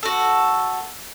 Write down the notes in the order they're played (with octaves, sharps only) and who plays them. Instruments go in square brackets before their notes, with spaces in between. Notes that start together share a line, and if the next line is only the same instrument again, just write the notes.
[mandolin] F#4 A4